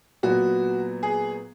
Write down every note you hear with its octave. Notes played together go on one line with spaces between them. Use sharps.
A#2 F#3 B3 F#4
G#4